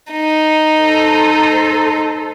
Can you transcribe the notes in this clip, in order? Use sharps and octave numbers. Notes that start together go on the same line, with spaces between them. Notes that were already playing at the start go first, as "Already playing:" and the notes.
D#4
A4 C5